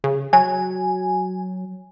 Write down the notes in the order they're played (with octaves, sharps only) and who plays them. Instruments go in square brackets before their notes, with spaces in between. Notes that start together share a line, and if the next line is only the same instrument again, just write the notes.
[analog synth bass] C#3
[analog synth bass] F#3 [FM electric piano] G#5